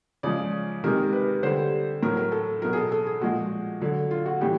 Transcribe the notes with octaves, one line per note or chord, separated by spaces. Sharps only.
C#3 F3 G#3 D5
C3 D#3 G#3 A#4
B4
D3 G3 C5
A2 F#3 A#4
A#4
A4
B2 F#3 A#4
G#4
A4
A4
G#4
A#2 F3 G#3 F#4
D3 F#3
F4
F#4
A2 E3 G3 G4